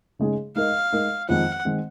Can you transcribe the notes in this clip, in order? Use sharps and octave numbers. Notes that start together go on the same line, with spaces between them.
C#3 G#3 D#4 G#4
G#3 D#4 A#4 D#5 F5
G#3 D#4 A#4 D#5
F2 D#3 G#3 C4 F#5
D#3 G#3 C4